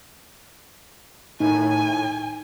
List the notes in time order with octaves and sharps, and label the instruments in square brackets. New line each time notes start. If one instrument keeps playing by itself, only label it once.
[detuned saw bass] A2 [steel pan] D#4 [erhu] G#5